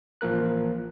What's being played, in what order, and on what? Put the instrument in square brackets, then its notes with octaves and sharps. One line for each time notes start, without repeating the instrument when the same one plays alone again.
[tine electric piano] A1 F3 A#3 A#4 F#6